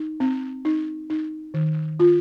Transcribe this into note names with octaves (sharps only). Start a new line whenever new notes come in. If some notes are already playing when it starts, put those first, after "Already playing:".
Already playing: D#4
C4
D#4
D#4
D#3
F4